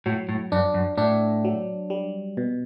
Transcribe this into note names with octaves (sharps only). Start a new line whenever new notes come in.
A2 F#3
A2
F#2 D4
F#2
A2 D4
F#3
G3
B2